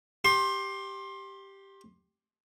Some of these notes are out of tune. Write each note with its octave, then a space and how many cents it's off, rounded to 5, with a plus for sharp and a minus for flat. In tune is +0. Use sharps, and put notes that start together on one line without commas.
G4 +0 C6 +25